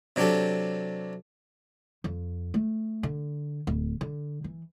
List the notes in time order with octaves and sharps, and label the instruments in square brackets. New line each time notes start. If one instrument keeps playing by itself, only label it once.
[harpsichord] C3 F#3 D4 G4 A4
[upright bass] F2
A3
D3
D1
D3
E3